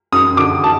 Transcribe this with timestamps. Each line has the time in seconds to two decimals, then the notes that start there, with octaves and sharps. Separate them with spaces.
0.12 F#2 D#6
0.37 D3 D6
0.64 A5